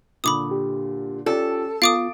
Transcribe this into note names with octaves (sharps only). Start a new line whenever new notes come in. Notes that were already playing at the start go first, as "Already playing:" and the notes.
A#2 D3 B5 D6 D#6
G4
C#4 F4 G4 A4 D5
B3 F4 F5 D6 D#6 A6 D7